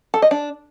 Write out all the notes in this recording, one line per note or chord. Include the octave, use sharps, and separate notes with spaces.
A4
D#5
D4